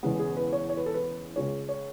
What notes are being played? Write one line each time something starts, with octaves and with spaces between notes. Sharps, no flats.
E1 E2 C#3 G#3 B3 B4
G#4
B4
C#5
C#5
B4
A4
B4
C#2 C#3 G#3 C#5
C#5